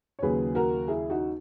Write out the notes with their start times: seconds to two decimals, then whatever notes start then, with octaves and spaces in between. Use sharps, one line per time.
0.19 C#5
0.22 D#2 C#3 F#3 G#4 B4
0.55 F#4 A#4
0.88 E4 G#4
1.10 D#4 F#4